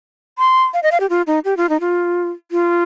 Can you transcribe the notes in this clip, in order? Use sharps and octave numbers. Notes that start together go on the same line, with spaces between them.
C6
F5
D#5
F5
G4
F4
D#4
G4
F4
D#4
F4
F4